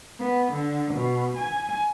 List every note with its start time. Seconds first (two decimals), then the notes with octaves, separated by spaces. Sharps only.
0.20 B3
0.53 D3
0.93 B2
1.37 G#5